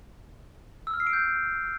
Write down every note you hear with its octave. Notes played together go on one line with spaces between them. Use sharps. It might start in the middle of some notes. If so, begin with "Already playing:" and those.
E6
F6
C7
D7
G6